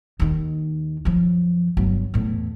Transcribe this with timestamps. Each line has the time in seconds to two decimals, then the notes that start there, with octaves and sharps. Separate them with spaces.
0.19 D#2 D#3
1.05 F#2 F3
1.77 G1 F#3
2.14 E2 A2